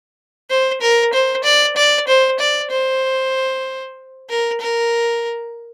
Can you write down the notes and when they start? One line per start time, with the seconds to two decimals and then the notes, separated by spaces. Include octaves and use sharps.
0.49 C5
0.81 A#4
1.13 C5
1.44 D5
1.76 D5
2.07 C5
2.39 D5
2.70 C5
4.29 A#4
4.60 A#4